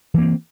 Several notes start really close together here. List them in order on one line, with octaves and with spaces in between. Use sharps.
E3 A#3 C4